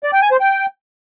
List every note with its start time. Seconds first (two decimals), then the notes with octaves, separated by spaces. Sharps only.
0.03 D5
0.13 G5
0.22 G#5
0.31 C5
0.40 G5